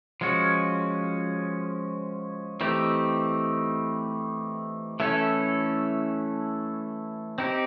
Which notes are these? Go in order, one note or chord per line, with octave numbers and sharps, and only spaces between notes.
F3 G#3 C#4 F#4
E3 A3 C4 D#4 G4
E3 A3 C#4 E4 A4
C4 D#4 G4